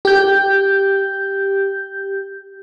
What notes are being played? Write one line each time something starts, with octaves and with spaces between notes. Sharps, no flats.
G4 G6